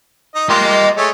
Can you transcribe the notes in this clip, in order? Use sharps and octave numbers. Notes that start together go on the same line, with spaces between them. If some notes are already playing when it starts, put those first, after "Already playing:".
D#4 D#5
A#3 F4 G4 D#5 C6
G#3 A3 C#5